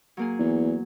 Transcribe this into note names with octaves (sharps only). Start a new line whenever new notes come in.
F#3 A#3 G#4
E2